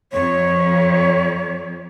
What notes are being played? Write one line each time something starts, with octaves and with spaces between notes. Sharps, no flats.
F2 C#5